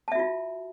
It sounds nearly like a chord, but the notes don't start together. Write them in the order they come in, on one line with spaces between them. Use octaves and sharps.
A5 E5 F#4 F4